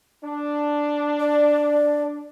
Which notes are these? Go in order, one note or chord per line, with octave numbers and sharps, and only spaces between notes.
D4
D5